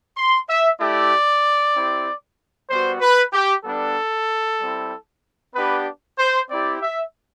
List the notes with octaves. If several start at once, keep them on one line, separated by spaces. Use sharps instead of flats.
C6
E5
A3 E4 G4 D5
C4 E4 G4
G3 B3 F#4 C5
B4
G4
G3 B3 D4 A4
G3 C4 E4
B3 D4 G4 B4
C5
C4 E4 G4 D5
E5